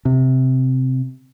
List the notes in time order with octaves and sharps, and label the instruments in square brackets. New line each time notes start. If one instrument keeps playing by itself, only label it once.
[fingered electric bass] C3